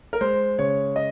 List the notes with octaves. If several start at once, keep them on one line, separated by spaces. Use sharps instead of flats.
A#4
G#3 C5
C#3 C#5
D#5